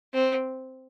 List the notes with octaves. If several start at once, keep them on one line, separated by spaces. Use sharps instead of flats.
C4